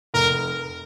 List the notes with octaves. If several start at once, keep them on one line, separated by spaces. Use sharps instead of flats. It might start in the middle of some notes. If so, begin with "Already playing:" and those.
F1 A#4